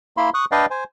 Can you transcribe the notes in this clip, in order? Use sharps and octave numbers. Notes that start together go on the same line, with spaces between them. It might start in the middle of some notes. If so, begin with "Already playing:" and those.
A#3 E4 B5 C6
C#6 D#6 F#6
D4 B4 D5 D#5 F5 G5
C5 G#5